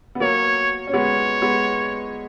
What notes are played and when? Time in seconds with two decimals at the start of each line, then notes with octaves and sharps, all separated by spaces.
0.15 B3
0.20 F#3 A#3 C#5
0.87 C#4
0.94 G#3 B3 C#5
1.42 G#3 B3